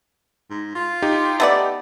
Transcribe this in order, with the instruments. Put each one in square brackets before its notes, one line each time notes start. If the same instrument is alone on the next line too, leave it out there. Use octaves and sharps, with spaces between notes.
[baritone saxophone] G#2
F4
[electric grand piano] D#4 G4
[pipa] A3 B3 D5